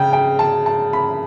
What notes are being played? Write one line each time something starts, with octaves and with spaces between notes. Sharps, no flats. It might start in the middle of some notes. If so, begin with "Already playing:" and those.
Already playing: C#3 G5
G5
A5
A5
B5